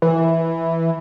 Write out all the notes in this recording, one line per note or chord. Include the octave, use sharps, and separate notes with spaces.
E3